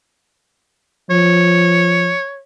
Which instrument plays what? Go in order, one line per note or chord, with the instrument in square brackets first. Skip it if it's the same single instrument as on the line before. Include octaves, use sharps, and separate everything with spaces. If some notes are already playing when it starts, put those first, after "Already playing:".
[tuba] F3 [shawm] C#5